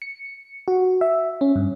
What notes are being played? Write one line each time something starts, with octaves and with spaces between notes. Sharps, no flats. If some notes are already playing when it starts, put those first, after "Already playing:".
C#7
F#4
E5
C#4
G2